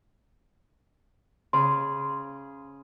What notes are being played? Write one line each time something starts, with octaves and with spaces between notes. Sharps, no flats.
C#3 C6